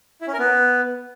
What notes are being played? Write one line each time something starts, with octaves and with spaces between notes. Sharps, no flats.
E4
C#4
A#4
B3